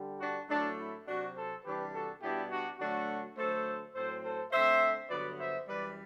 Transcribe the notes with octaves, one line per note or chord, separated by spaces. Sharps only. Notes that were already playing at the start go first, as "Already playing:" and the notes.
Already playing: D3 G3
D4 F#4
A2 F#3 A3 D4
E4
C3 F#3 C4 D4 F#4
A4 C5
C3 E3 G3 D4 G4 B4
F#4 A4
B2 G3 B3 D4 E4 G4
D4 F#4
D3 F#3 A3 D4 F#4
D3 F#3 A3 A4 C5
A2 F#3 C4 A4 C5
A4 C5
D3 A3 C4 C5 E5
G2 D3 F#3 B3 B4 D5
C5 E5
F#2 E3 G3 B4 D5